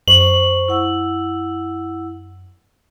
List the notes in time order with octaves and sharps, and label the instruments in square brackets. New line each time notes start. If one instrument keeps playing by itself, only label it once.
[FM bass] F#2 [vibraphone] C5 C#6 [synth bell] F#7
[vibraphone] E4 F#5 E6